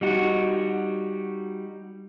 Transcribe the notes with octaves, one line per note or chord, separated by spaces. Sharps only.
G3 D#4 F#4